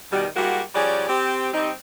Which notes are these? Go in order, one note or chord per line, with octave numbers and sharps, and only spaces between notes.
B2 D#3 G3
G3 G#3 A#3 E4 F#4
F3 G3 C#4 F#4 G#4 D5
C4 G4
G3 C4 D#4